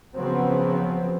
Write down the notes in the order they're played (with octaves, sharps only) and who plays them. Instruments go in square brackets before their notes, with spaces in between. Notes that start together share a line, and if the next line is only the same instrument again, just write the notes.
[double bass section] C#3 F3 F#3 B3 C4